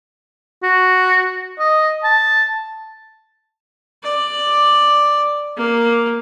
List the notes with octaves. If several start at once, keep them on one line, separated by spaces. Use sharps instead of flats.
F#4
D#5
A5
D5
A#3